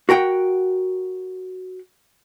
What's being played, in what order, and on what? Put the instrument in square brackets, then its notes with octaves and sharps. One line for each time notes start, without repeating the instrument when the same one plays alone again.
[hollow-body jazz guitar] F#4 A#4 F#5 G5